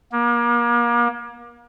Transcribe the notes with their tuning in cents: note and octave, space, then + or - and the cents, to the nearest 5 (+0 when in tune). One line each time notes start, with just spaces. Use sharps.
A#3 +35